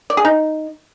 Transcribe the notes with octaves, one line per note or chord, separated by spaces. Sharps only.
D5
G#4
D#4